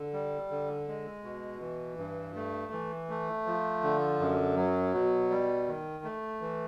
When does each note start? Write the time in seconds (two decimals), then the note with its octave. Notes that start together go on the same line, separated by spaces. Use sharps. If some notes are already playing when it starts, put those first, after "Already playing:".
Already playing: D3
0.13 G3
0.50 D3
0.88 G#3
1.24 B2
1.61 E3
1.98 G2
2.36 A3
2.73 E3
3.09 A3
3.46 F3
3.83 D3
4.20 F#2
4.56 F#3
4.94 B2
5.30 G3
5.68 D#3
6.04 A3
6.41 E3